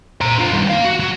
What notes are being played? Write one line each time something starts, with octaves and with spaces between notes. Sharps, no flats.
C5 A#5
D3 F4
G2 D#3
A#3 F5
F#4
F#3